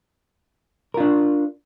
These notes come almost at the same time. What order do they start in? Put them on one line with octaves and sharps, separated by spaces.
A#4 F4 D4